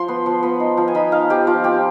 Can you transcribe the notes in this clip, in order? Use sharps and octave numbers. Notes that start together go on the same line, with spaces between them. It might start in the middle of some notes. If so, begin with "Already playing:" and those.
Already playing: F3 C6
B3
F3
B3
D#4
F3
G#5
D#4 B5
D#4 F5
F3 G4
F3 F4
C4 G4